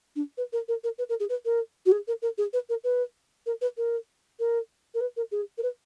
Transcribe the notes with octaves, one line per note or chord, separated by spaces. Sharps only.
D4
B4
A#4
A#4
A#4
B4
A#4
G#4
B4
A#4
F#4
G#4
A#4
A#4
G#4
B4
A#4
B4
A#4
B4
A#4
A#4
A#4
B4
A#4
G#4
A#4
B4